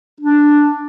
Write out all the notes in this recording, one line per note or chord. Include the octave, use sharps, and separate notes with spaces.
D4